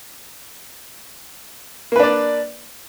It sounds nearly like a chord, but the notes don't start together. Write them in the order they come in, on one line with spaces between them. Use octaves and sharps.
A#3 B4 D4 D5